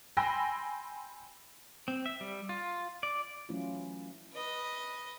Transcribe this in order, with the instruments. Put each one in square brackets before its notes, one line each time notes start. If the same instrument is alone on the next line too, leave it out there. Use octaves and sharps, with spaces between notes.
[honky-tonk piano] G5 G#5 B5 C6 E6 A#6
[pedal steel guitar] C4
E5
G3
F4
D5
[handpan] E3 F#3 A3 C#4 E4 F4
[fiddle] B4 D#5